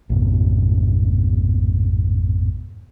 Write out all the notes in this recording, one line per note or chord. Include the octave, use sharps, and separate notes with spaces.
A1 F2 G#2 B2